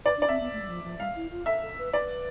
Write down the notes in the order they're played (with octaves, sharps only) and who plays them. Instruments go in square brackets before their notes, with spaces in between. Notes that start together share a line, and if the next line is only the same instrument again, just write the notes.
[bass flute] B4 [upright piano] D5
[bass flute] D4
[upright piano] D5
[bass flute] C4 [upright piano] E5
[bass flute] B3
A3
G3
F3
F3
[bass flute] G3 [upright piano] F5
[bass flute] E4
F4
[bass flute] A4 [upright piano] E5
[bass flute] A4
B4
[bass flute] B4 [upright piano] D5